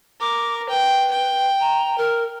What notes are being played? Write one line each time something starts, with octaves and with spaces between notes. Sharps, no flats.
A#4 D6
B4 G5
G5
A#5
A#4